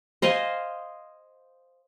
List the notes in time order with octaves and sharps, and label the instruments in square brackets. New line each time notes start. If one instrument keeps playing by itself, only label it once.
[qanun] C5 D#5 F5 G#5